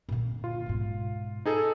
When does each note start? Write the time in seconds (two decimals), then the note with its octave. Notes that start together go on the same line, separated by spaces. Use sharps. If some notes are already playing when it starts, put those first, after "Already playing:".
0.09 A#2 D3
0.44 F4
0.66 G#2 B2
1.45 D#4 G#4 A4